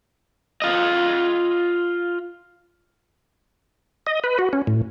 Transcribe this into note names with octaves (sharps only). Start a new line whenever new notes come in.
F4 D#5
D#5
B4
F#4
C#4
A2